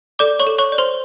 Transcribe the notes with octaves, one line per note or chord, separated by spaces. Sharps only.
A4 D5 D6
C#5 C#6
A4
C#5 C#6
D5
C5 C6